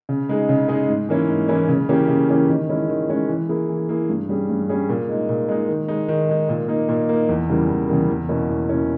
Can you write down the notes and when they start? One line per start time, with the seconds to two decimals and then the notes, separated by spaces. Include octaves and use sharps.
0.09 C#3
0.29 G#3 D#4 G#4
0.49 C#3
0.68 G#3 D#4 G#4
0.88 G#2
1.09 E3 A#3 C#4 E4
1.29 G#2
1.48 E3 A#3 C#4 E4
1.69 C#3
1.89 E3 A#3 C#4 G4
2.08 C#3
2.29 E3 A#3 C#4 G4
2.49 D#3
2.69 G#3 C#4 E4
2.89 D#3
3.09 G#3 C#4 E4
3.29 E3
3.49 A#3 E4 G#4
3.69 E3
3.89 A#3 E4 G#4
4.09 G2
4.29 G3 C#4 G#4
4.49 G2
4.69 G3 C#4 G#4
4.89 A#2
5.09 G#3 D#4
5.29 A#2
5.49 G#3 D#4
5.69 D#3
5.88 G#3 D#4
6.08 D#3
6.29 G#3 D#4
6.49 A#2
6.68 A#3 D#4
6.89 A#2
7.09 A#3 D#4
7.29 E2
7.49 C#3 E3 G3 A#3
7.69 E2
7.88 C#3 E3 G3 A#3
8.09 E2
8.29 B2 A#3 C#4 E4
8.49 E2
8.69 B2 A#3 C#4 E4